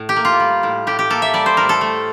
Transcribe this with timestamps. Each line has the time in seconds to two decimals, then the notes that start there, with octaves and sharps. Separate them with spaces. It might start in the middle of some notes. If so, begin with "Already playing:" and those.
Already playing: A2
0.09 G4
0.16 A#3
0.25 F4
0.40 G3
0.63 A2
0.87 A2 G4
0.99 G4
1.10 A#3 A4
1.22 E5
1.34 G3 D5
1.46 C5
1.57 A2 A#4
1.69 A4
1.81 A3